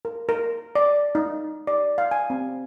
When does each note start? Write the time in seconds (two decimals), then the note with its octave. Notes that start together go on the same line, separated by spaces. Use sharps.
0.05 A#4
0.29 A#4
0.75 D5
1.15 D#4
1.67 D5
1.98 F5
2.11 G#5
2.30 C4